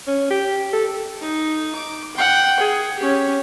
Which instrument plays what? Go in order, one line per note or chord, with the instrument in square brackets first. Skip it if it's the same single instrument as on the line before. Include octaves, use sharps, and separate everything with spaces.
[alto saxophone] C#4
G4
A4
[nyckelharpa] D#4
D6
F#5 G5
G#4
C#4 G4